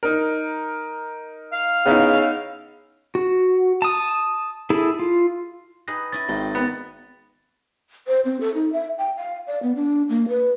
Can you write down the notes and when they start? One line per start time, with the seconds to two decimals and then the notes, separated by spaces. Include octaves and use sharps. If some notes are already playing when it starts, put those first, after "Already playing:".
0.03 D#4 A#4
1.52 F5
1.86 C#3 B3 D#4 E4
3.15 F#4
3.82 A5 D#6
4.70 E4 G#4 A4
4.99 F4
5.88 D#4 G#4 B4 A#6
6.12 C#4 E4 G#5 A6
6.28 G#1 G#4 G5
6.55 B3
8.07 C5
8.25 C4
8.41 A4
8.54 D#4
8.73 E5
8.98 G5
9.17 F5
9.47 D5
9.63 B3
9.76 D4
10.09 A#3
10.29 B4